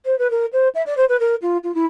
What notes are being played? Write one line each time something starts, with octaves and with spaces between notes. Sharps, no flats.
C5
B4
A#4
C5
E5
D5
C5
B4
A#4
F4
F4
E4